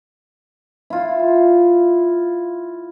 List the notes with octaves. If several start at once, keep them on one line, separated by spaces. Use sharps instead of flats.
E4 F4